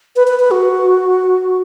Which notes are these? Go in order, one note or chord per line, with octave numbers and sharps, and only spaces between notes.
B4
B4
B4
F#4